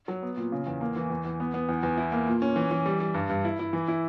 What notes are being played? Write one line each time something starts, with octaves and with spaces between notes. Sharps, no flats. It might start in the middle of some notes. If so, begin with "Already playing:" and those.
F#3
B3
A#2
C#3
E2
A#3
E3
E2
E2
B3
B3
E2
E2
E4
A#3
A#2
C#4
E3
E3
G3
G3
G2
G2
E4
E4
E3
E4